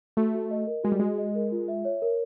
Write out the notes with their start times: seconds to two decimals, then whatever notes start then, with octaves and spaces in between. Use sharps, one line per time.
0.17 A3 F#4
0.34 F#4
0.51 D#5
0.67 A#4
0.84 G#3 F#4
0.92 G3
0.99 G#3 F#4
1.18 D#5
1.35 A#4
1.52 F4
1.68 E5
1.85 C#5
2.02 A#4